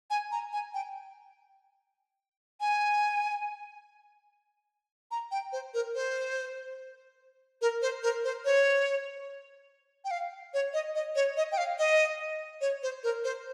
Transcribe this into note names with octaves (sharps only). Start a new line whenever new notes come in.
G#5
A#5
G#5
G5
G#5
A#5
G5
C5
A#4
C5
A#4
C5
A#4
C5
C#5
G5
F5
C#5
D#5
D#5
C#5
D#5
G5
F5
D#5
C#5
C5
A#4
C5